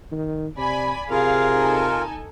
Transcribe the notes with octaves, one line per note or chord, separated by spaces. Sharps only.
D#3
C3 D5 G#5 B5
C3 F4 G#4 A#4 F5
D#4 A4 G#5